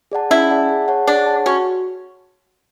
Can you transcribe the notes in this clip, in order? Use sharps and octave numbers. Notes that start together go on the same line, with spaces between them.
G#4 D5 F#5 A5
C#4 E4
G#4 D5 F#5 A5
G#4
C#5 F#5 A5
D4 G#4
C#5 F#5 A5
C#4 F#4